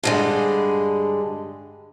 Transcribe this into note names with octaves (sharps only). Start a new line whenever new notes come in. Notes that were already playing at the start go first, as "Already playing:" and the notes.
G2 D3 G#3